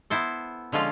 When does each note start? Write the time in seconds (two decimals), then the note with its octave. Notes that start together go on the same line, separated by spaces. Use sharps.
0.10 B3 E4 A4 C5
0.72 D3 F3 G#3 C#4 F4